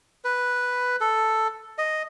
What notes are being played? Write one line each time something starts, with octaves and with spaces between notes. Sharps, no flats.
B4
A4
D#5